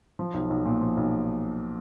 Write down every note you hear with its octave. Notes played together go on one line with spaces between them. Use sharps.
F3
B1
B1
A#2
F3
B1